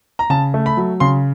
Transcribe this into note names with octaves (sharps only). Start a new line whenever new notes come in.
A#5
C#3 A5
A3
B5
F#3
C#3 C6